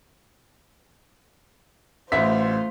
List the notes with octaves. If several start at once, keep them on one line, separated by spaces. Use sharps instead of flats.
A1 A3 F4 C5 E5 B6